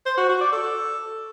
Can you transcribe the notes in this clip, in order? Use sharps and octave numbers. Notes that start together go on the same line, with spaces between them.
C5
F#4
F#4
D5
A4